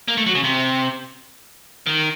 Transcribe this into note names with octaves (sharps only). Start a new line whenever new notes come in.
A#3
A3
F#3
C#3
C3
D#3